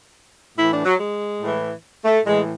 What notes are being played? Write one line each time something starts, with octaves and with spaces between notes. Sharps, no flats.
A2 E3 E4
D4
F#3
G#3
A2 E3
A3
A2 E3 G#3